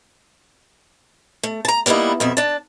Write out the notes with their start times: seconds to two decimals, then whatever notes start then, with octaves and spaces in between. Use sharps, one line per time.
1.43 A3
1.65 A5 A#5
1.86 G3 A#3 B3 D#4 E4
2.20 F2 B2 E5
2.37 D4 A5